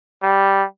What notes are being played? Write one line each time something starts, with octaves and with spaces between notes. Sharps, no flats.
G3